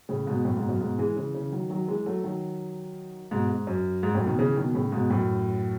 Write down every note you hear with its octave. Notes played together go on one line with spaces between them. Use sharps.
A2 C#3
G#2 B2
F#2 A2
G#2 B2
F#2 A2
G#2 B2
E3 G#3
C#3 E3
C#3 E3
D#3 F#3
D#3 F#3
E3 G#3
F#3 A3
D#3 F#3
G#2 B2
G#2
F#2
G#2
F#2 A2
B2 D#3
C#3 E3
B2 D#3
A2 C#3
G#2 B2
F#2 A2